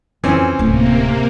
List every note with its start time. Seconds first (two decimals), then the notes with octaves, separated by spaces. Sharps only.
0.24 F2 E3 C4 C#4
0.59 D1 C3 A3 A#3